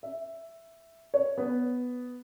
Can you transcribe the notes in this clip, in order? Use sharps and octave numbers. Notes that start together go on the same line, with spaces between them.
E5
C#5
B3